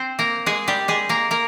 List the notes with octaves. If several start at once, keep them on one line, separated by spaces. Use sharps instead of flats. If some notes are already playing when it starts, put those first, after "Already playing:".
Already playing: C4 C5
A#3 A#4
G#3 G#4
G3 G4
G#3 G#4
A#3 A#4
A#3 A#4